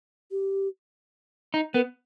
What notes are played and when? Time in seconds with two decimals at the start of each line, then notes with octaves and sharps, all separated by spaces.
0.31 G4
1.54 D#4
1.74 B3 A#4